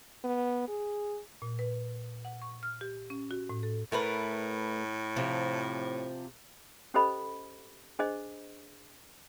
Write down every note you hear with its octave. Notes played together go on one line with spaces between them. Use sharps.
B3
G#4
A#2
B4
F#5
C#6
F6
G4
C#4
F#4
A2
A4
A2 A3 A#4 B4
C3 F3
C#4 G4 A4 C5 D#5 B5
D4 G#4 C5 D#5